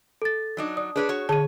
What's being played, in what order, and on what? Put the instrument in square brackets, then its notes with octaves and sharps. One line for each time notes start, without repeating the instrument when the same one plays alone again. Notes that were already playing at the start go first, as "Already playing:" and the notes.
[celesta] A4 A6
[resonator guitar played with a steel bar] F#3 D4 D#4
[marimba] D5 [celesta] D#6
[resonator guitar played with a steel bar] D4 B4 C#5 [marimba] G#4
[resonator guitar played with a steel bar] F#4 C#5
[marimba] D3 G#4 [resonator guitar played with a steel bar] C#5 [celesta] A5 D#7